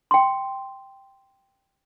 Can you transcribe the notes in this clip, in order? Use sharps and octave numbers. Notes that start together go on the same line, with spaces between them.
G5 C6